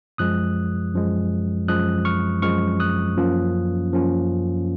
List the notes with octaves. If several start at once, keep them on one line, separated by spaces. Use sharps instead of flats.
F#2 F3 G#3 D#6 F#6
F#2 F3 G#3
F#2 F3 G#3 D#6 F#6
C#6 F6
F#2 F3 G#3 C#6 F6
D#6 F#6
F#2 F3 A#3 C#4 F4
F#2 F3 A#3 C#4 F4